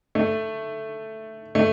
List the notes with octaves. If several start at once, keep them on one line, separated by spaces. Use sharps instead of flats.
A3
A3